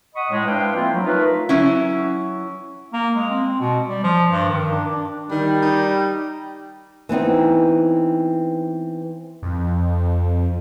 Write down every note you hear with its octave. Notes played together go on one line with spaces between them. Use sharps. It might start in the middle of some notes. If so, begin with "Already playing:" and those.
D#5 F#5 B5 C#6 D#6
A2 G#3
D4 E4 B4 C5 F5 G5
F3 A3 A#3 C4 E4 F4
F#3
A3 D#4 F4 A#4 B4
F#3 C#4 E4
A#3
G#3
C4
B2
G3
F3
G2
D#3
D4
D4
D#3 G3
D#4
E3 B3 C4 D#4
F2